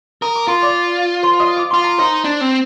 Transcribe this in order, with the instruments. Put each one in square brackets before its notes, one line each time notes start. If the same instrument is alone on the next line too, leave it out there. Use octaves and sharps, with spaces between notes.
[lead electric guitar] A#4 [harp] D#6
[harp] D6
[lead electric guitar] F4 [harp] C6
[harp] D5 D6
C5 C6
D#5 D#6
D6
[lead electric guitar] F4 [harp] C6
[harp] A#5
[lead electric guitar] D#4 [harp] C5 C6
[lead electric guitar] D4
C4